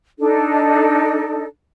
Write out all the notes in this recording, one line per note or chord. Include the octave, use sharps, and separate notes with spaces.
D4 D#4 A4